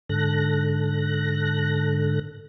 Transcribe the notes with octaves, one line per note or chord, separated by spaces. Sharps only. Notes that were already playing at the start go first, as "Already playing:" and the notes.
G#2 D3 A4 F#6 A#6